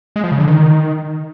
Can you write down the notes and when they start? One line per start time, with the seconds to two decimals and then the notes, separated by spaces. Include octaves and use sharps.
0.16 G#3
0.24 F3
0.32 C#3
0.40 D3
0.48 D#3